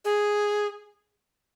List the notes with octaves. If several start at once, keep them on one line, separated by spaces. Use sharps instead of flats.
G#4